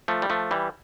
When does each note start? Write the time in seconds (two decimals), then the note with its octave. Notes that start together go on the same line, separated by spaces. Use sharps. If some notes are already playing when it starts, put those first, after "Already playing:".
0.08 F3 A3
0.22 G3
0.30 F3 A3
0.51 E3 G3